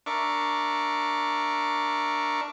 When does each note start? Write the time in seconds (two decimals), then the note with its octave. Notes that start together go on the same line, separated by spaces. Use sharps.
0.06 D4 A#4 E5 C#6 D6